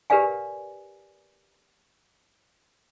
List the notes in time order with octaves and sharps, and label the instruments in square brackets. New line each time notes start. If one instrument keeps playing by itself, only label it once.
[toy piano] G4 A#4 B4 D5 F5 G#5